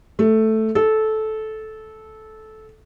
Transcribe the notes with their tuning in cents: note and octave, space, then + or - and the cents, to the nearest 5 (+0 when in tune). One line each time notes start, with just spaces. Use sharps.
A3 +0
A4 -15